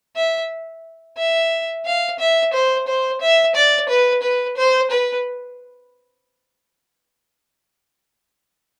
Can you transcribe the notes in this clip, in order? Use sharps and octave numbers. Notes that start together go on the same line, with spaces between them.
E5
E5
F5
E5
C5
C5
E5
D5
B4
B4
C5
B4